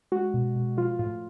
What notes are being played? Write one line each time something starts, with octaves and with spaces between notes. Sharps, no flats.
G#3 F#4
B2
B2
F3 F4
A2 F4